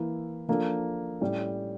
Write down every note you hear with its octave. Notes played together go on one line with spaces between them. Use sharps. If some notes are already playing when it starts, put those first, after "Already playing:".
Already playing: E3 A#3 E4
F3 A#3 D4 A4
A2 G3 C#4